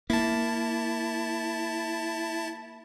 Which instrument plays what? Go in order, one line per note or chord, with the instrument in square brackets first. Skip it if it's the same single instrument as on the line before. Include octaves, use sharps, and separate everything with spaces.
[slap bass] A#3 [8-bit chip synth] E4 A5